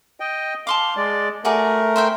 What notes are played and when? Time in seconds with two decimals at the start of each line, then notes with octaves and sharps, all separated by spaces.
0.20 D#5 G5
0.67 F5 A5 C6 D6
0.97 G#3 D5
1.45 A3 F#4 G#4 A#4 D5
1.96 C5 E5 G5